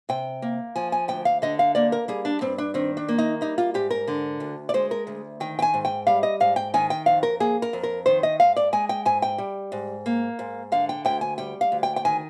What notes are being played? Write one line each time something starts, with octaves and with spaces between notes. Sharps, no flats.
C3 G5
A#3
F3 G#5
G#5
D2 G5
F5
D3 D#5
F5
A#3 D5
A#4
G3 G#4
D4
G2 C4
D4
D#3 C4
D4
A#3
D#4
G3 D#4
F4
G#2 G4
A#4
D3
D2
D5
G#3 C5
A#4
D2
D#3 G5
G5
G#5
G#2
G5
G3 F5
D#5
G#2 F5
G5
D#3 G#5
G5
F2 F5
A#4
A#3 G#4
A#4
F2
A#4
D#3 C5
D#5
G#2 F5
D5
G#3 G#5
G5
G#2 G#5
G5
G3
G#2
A#3
G#2
D3 F5
G5
D2 G5
G#5
G3 G5
F5
D2
G5
G5
D#3 G#5